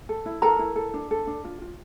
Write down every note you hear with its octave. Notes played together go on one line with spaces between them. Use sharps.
A4
E4
A4 A#4 A#5
E4
A4
D4
A4
D4
F4
F4